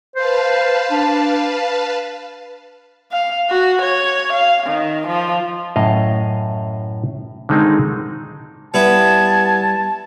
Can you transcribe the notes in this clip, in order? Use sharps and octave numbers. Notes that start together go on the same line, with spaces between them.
B4 C5 F5 A5
D4
F5
F#4
C#5
F5
D#3
F3
F#2 A2 D#5 F5
D3 D#3 G#3 C4 D#4
G3 B3 E4 A5 G#6